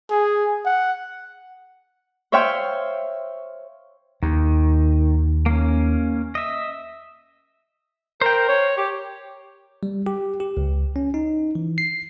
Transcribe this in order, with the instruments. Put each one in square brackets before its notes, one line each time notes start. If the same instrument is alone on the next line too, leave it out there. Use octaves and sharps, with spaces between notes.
[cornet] G#4
F#5
[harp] C5 C#5 E5 F5 G5 C6
[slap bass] D#2 [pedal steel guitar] D#3
[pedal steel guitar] A#3 C#4
D#5 E5
[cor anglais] A#4 [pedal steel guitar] C5 G5
[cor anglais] C#5
G4
[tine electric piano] G3
G4
G4
C#2
C#4
D#4
E3
C7